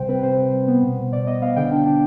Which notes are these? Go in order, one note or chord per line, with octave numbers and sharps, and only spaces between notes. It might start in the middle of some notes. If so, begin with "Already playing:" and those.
Already playing: C3 G3 C5 G5
C4 B4
B4
C3 C5
C3
G3
B3
B2
B2
B2 D5
B3 D#5
B3 F5
D3 G5
D4
D4